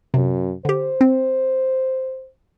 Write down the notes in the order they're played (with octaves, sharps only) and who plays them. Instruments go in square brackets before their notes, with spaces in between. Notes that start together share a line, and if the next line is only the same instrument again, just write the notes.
[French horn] F#2 [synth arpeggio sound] C3
[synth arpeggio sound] D3 G4 [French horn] C5
[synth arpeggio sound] C4